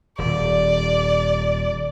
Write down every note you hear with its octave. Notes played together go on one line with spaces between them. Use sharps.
D#1 D5